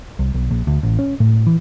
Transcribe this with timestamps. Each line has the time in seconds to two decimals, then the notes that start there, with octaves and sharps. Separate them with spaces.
0.19 C2
0.34 B1
0.51 A#1
0.67 D2
0.83 A1
0.99 C#4
1.20 A2
1.47 E3